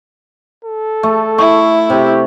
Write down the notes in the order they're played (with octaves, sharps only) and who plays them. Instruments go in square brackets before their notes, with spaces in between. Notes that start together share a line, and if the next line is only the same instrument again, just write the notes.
[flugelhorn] A4
[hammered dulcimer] A3
[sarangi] E4 [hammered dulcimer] C#6
[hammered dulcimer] C3 [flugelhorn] G4